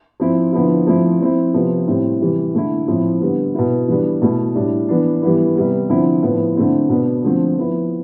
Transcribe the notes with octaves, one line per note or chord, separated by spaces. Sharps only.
F3 C4 E4
D3 F3 B3 E4
F3 A3 C4 E4
F3 C4 E4
C3 F3 B3
A2 G3 C4
C3 E3 G3
D3 A3 E4
A2 F3 C4 E4
D3 G3 B3
B2 B3 E4
E3 G3 B3 D4
B2 A3 E4
A2 G3 D4
E3 B3 D4
E3 G3 B3 E4
C3 G3 B3
D3 F3 C4 E4
A2 F3 B3
D3 A3 C4 E4
B2 B3 D4
D3 F3 A3 C4
F3 B3 E4